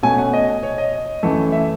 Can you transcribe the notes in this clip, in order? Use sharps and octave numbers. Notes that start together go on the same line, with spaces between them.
B2 A3 C#4 G#5
F#5
D#5
C#5
D#5
F#2 E3 A3
E5